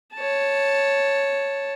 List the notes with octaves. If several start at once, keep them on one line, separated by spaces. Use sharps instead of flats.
C#5 A5